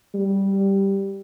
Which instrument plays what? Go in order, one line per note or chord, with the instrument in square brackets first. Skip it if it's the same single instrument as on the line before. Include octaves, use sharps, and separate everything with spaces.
[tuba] G3